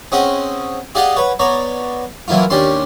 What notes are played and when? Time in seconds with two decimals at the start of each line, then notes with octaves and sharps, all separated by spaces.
0.12 C4 C#4 G#4 D#5 F#5
0.95 G4 G#4 D5 D#5 F5 F#5
1.16 B4 C#5 F#5
1.39 B3 C#5 D5 A#5
2.28 E3 F#3 A#3 E4 F4
2.50 D#2 C#4 D4 G4 D5 C6